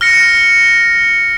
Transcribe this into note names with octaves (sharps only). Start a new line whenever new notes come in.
F6 A#6 C#7